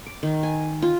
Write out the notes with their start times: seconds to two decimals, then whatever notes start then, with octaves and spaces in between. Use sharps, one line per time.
0.06 D6
0.23 D#3
0.43 G#5
0.82 F4